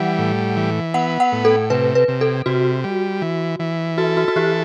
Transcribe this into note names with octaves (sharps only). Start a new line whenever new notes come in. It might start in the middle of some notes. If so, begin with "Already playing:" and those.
Already playing: E3 G3 F#5
A2
E3
B3 F#5
F#5
A2
A4
C3 B4
B4
C3
A4
C3 F#4
G3
E3
E3
F#4 A4
F#4
F#4
E3 G4